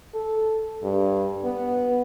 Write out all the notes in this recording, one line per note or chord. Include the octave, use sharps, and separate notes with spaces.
A4
G2
B3